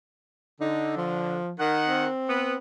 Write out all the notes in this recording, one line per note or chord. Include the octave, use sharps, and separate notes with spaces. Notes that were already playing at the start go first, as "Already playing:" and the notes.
D3 D#4
F3
D#3 F#5
C4
B3 B4